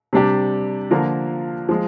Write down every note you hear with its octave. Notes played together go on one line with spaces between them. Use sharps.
C3 G3 D4 G4
D3 F3 A#3 F4 A#4
F3 G#3